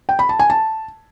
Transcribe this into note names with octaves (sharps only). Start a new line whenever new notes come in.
G5
B5
A5
G#5
A5